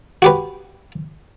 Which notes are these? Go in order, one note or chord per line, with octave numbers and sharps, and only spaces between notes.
F#4 G4 B4